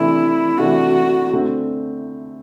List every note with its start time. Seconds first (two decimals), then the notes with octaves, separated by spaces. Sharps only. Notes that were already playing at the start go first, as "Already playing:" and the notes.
Already playing: C3 E3 A3 D4 E4
0.58 C3 E3 A3 D4 F#4
1.33 D3 A3 C4